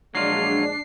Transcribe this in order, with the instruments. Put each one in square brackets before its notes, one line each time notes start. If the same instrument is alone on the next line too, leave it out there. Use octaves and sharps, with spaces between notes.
[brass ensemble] A#1 G#3 [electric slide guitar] F#3 F4 [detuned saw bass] D4 [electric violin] C7